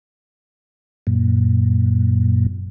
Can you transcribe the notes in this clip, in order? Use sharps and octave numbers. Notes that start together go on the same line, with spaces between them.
F#2 A#2